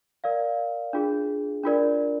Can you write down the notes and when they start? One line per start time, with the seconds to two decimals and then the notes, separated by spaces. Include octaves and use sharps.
0.24 A#4 D5 F5
0.93 D4 F4 G#4
1.64 D4 F4 A#4 D5